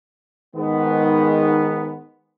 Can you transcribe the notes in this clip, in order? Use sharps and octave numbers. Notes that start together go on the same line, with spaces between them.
G#2 D#3 B3